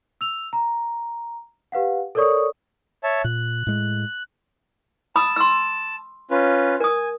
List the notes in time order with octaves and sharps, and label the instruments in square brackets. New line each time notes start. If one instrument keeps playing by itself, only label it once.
[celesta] E6 F7
A#5
G4 B4 F5 F#5
A4 A#4 C#5 D5 C#6 D#6
[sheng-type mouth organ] C#5 E5 A5
[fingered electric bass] A#2 [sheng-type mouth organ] F#6
[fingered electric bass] A2 G#3
[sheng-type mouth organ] A5 [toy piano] B5 D#6 E6
[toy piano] C6 E6
[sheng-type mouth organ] C#4 F4 B4
[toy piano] A#4 D#6 [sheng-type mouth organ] G#5